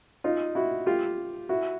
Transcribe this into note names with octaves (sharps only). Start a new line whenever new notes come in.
D#4 F4
E4 F#4
F4 G4
E4 F#4